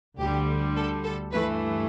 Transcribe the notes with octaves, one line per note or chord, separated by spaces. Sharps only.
D2 D3 G3 G4
A4
A4
G2 E3 A3 B4